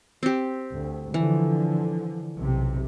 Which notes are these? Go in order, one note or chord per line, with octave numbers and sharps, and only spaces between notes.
C4 G4
D2
D3 E3 F3
B1 C3